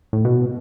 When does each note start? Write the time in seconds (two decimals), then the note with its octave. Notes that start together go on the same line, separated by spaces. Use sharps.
0.13 A2
0.25 B2